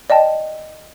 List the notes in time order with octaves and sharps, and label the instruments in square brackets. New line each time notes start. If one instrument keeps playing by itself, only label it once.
[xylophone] D5 D#5 G5 A5